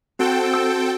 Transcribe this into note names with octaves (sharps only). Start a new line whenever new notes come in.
C4 F#4 A4 G5
E6